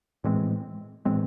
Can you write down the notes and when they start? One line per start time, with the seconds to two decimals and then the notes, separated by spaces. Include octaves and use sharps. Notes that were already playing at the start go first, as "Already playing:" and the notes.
0.24 A2 E3 G#3 C4
1.05 A2 E3 G#3 C4